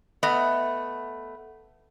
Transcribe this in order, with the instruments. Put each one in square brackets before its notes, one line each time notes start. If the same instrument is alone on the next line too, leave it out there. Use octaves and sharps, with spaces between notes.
[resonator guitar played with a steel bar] A3 B3 D#5